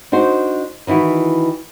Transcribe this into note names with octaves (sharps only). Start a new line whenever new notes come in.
D4 D#4 F#4 C5
D#3 E3 E4 F#4